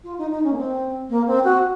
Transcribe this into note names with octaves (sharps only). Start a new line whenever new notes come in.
F4
D#4
D#4
C#4
A#3
C4
A#3
C4
F#4